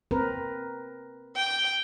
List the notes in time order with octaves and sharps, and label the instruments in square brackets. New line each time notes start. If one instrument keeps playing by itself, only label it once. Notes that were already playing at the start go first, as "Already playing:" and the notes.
[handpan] C4 A#4 B4
[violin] G5